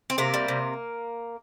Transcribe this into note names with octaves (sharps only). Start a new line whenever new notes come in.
C4
C3 A#3
G3
C3